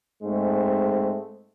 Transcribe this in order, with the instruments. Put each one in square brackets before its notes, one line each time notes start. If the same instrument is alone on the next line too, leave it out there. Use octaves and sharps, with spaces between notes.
[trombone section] G#2 G#3 A3 C4